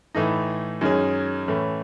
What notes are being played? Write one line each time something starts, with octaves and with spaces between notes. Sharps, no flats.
A2 E3 A3 D#4
F#2 D#3 G#3 C#4 G#4
A2 E3 A3 C#4